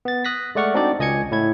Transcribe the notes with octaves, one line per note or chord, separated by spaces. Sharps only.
B3 A6
D#6 F#6 A#6 B6
G#3 A3 D5 F#5 C#6 F6
C4 D4 D#4 F#4 D5
C#2 D#5 G#5 G#6 C#7
A2 E4 G#6